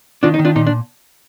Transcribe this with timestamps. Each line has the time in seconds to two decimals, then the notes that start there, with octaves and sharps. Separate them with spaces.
0.23 D#3 D4 F4
0.34 D#4
0.39 D#3
0.45 D4 F4
0.55 A#2 D#4
0.67 D4